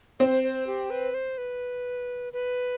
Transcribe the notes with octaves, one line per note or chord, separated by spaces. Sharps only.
C4 C5
C5
G4
B4
C5
B4
B4